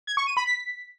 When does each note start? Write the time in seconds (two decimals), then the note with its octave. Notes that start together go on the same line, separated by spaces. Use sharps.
0.07 G#6
0.17 C#6
0.27 D#7
0.37 B5
0.47 B6